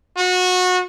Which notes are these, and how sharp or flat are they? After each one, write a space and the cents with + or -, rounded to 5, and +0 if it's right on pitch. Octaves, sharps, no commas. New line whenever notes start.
F#4 -25